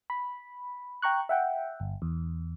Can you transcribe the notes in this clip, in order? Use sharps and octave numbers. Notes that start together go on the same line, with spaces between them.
B5
G5 A#5 C#6 F#6
E5 F#5 G5
G1
E2